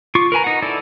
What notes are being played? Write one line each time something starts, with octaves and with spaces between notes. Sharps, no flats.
F4 C#6 D6
A#4 B4 G#5 A#5
D#4 F#5
D#4 E4 A4 D5